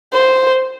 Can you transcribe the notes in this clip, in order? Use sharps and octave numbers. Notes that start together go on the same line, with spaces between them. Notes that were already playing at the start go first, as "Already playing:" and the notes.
C5